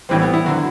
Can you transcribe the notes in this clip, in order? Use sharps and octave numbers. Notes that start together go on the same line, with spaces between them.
A2 E3 G3 C4
B3
E4
D3 F#3 F#4